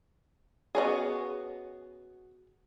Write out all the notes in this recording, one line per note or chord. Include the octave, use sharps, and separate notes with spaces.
B3 C#4 F#4 G#4 C#5 D#5